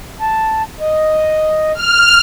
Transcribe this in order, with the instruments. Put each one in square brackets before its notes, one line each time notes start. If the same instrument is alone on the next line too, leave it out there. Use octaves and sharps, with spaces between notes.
[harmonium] A5
D#5
[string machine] F6